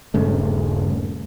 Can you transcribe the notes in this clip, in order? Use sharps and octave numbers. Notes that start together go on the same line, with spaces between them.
D#1 G2 C#3 A3